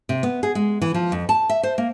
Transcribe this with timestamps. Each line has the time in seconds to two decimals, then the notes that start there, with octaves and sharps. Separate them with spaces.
0.09 C3
0.23 B3
0.43 G#4
0.55 G#3
0.82 E3
0.94 F3
1.12 F2
1.29 A5
1.49 E5
1.63 C5
1.78 A#3